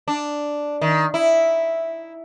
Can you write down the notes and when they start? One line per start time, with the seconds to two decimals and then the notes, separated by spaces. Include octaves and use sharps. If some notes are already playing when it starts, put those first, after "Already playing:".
0.08 D4
0.82 D#3
1.14 E4